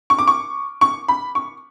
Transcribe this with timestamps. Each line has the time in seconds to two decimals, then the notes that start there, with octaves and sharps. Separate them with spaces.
0.10 C#6
0.18 D6
0.27 C#6
0.81 C#6
1.08 B5
1.35 C#6